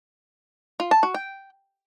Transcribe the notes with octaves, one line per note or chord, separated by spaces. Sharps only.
F4
A5
F#4
G5